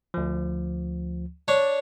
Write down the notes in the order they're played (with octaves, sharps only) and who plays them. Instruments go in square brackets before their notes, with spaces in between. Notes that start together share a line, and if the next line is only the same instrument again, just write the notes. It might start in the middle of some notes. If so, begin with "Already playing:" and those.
[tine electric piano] D2 F3
[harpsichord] D4 C#5 [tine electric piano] D5